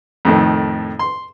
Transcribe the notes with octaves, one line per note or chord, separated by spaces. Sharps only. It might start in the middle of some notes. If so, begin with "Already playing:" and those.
F2 A2 D#3
C6